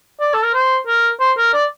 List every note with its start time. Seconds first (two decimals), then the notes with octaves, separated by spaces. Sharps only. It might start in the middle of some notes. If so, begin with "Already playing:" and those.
0.20 D5
0.34 A4
0.44 A#4
0.53 C5
0.87 A#4
1.20 C5
1.37 A#4
1.53 D5